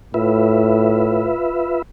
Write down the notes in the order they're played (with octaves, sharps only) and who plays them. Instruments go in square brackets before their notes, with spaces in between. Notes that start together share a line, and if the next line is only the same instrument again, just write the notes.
[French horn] A2 [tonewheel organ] F4 B4 E5